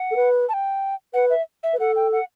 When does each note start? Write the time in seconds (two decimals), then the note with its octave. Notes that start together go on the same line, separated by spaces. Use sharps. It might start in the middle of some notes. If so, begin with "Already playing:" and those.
Already playing: F#5
0.11 A4
0.16 B4
0.49 A5
0.54 G5
1.14 B4 F#5
1.30 E5
1.63 E5
1.73 B4
1.79 A4 F#5
1.96 G5
2.12 F#5